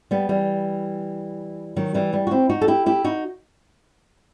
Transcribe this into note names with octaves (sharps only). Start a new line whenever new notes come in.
G3 B3
E3 G3
D#3 F#3
E3 G3
G3 B3
F#4
C4 E4
D#4 F#4
A4
E4 G4
E4 G4
D#4 F#4